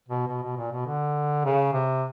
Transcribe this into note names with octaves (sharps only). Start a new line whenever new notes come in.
B2
B2
B2
A#2
B2
D3
C#3
C3